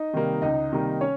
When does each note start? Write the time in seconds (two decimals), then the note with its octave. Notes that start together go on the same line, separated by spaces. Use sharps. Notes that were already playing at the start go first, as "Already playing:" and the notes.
Already playing: D#4 D#5
0.13 C3 D#3 G3 A#3
0.42 C#2 D#4 D#5
0.72 C3 D#3 G3 A#3
1.01 C#4 C#5